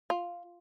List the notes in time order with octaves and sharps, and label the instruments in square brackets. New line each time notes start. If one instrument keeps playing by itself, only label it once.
[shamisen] F4